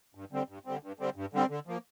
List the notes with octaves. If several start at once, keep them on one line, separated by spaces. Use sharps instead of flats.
G2
D3 G3 C4
G2
D3 G3 C4
G2
D3 G3 C4
G2
D3 G3 C4
D3
F3 A#3